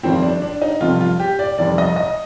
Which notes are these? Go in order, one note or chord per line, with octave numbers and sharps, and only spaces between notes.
G1 F2 D#3 G3 C4
D4
D4
D#4
F1 F2 C3 G3 F4
F4
G4
D5
F1 F2 D#3 G3 D5
D#5
D#5